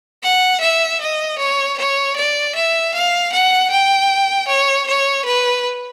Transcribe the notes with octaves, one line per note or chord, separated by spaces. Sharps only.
F#5
E5
D#5
C#5
C#5
D5
E5
F5
F#5
G5
C#5
C#5
B4